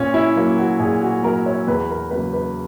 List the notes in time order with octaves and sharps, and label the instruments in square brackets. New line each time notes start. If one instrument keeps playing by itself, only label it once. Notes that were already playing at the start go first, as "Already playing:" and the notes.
Already playing: [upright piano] A#2 C#4
E4
F#3 A#3
F#4
A#2 G#4
F#4
F#3 A#3 A#4
C#5
E2 B4
A#4
C#3 F#3 A#3 B4
B4